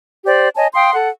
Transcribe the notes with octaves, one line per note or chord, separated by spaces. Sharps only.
G4 C5 D5
C#5 D#5 G#5 A5
F5 G5 C6 D#6
A4 F#5